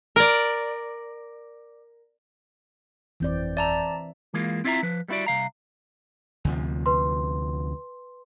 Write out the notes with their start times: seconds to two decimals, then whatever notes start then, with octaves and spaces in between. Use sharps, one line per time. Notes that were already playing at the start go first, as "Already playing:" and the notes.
0.16 A#4 D5
3.20 G1 F2 E3 C4 D5 G6
3.57 D5 E5 A5 A#5
4.34 E3 G#3 A#3 F4
4.64 C4 E4 F4 D#5 E5 A#5
4.83 F3 B4
5.08 G3 B3 E4 F#4 D5
5.26 C2 C#3 F5 A#5
6.45 D2 C3 F3
6.86 B4 C6